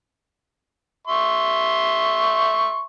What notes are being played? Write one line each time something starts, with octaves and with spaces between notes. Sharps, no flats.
E5 C6 C#6